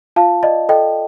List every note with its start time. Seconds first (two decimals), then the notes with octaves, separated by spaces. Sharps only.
0.16 F4 F5 A5
0.43 D5 D#5
0.69 A4 D#5 G5